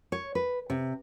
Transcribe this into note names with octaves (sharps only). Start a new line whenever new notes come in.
C#5
B4
C3